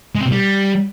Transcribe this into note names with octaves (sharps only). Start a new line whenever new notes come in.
G#3
C4
B2
G3